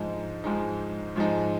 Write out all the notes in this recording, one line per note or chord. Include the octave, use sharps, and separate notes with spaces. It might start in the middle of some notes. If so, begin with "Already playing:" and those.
Already playing: G#2 F3 G#3 D#4
G#2 F3 G#3 D#4
G#2 F3 G#3 D#4